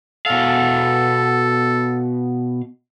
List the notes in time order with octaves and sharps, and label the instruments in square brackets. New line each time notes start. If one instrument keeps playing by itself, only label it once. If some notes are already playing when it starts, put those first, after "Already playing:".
[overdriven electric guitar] B2 F5 [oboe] A4